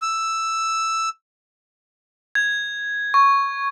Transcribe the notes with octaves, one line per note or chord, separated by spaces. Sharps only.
E6
G#6
C#6